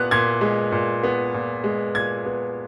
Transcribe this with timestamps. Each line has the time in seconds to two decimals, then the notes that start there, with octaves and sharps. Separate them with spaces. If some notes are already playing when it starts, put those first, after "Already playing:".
Already playing: A#2 B3 F#6
0.11 A#2 G#6
0.41 G#3
0.72 A#2
1.04 B3
1.34 A#2
1.64 G#3
1.95 A#2 G#6
2.25 B3